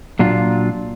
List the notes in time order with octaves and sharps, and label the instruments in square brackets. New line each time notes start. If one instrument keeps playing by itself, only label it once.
[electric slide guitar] A#2 F#3 D4 F4